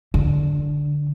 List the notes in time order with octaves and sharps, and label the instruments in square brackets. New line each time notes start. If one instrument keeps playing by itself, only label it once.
[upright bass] D3